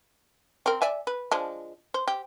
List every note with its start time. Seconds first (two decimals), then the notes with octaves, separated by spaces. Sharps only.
0.66 C4 A#4
0.82 D5 E5 G#5
1.07 B4
1.32 F3 G#3 D4
1.94 C5
2.08 G4